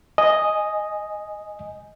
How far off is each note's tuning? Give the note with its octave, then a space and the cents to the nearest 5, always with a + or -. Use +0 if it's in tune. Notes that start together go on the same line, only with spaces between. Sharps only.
D#5 +0 G#5 +0